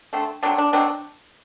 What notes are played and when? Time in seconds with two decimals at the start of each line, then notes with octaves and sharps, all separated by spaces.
0.13 D3 A3 C4
0.43 D3 F#3 C4 D4
0.58 D4
0.73 B2 F#3 C4 D4